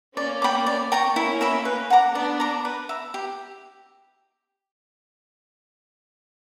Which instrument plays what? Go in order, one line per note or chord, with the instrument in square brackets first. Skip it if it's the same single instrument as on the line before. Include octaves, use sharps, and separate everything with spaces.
[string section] A#3 C#4 [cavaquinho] D5
[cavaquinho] G5 B5 D6
D5
G5 A#5 C#6
[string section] A#3 C#4 [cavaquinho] E4
[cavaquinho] A#4 E5 B5
B4
F#5 A#5 D6
[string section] B3 D4 [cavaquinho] D5
[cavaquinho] A#5 D6
B4
E5 A#5
G4